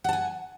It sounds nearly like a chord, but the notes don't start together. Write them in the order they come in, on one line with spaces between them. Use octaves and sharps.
F#5 A5 G#5